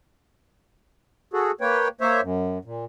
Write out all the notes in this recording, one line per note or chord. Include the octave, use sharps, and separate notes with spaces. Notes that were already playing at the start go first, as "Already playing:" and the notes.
F#4 G#4 A4
A#3 B4 C#5 G5
A#3 C5 C#5 E5
F#2
A#2